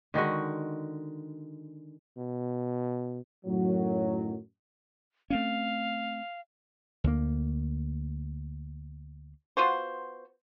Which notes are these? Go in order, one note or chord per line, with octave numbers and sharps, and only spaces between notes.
D3 D#3 G#3 F#4
B2
F#2 A2 D#3 F#3
A3 C4 C#4 F5
D2 A#3
B3 F4 F#4 C5